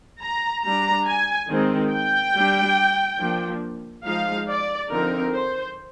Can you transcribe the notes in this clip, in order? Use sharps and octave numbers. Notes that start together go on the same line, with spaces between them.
A#5
G3 D4 A#5
G#5
D#3 G#3 C4 D#4
G5
G3 D4
F3 A#3 D4
F3 G#3 D#4 F5
D5
D3 F3 C4 D#4 A#4
C5